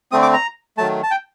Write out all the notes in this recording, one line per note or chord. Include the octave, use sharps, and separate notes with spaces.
D3 A3 C4 D#6
D6
A#5
D#3 F#3 A3 A5
A5
G5